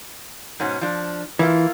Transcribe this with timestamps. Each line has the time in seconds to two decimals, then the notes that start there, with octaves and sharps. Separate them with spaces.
0.60 G#2 B2 C#4
0.81 F3 D4
1.39 E3 A#3 E4 F4